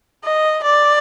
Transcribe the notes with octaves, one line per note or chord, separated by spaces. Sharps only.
D#5
D5